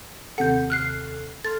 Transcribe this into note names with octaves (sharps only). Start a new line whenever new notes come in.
D#2 C3 A4 F#5 G6
F6 F#6 C7
A4 C6 F6 A6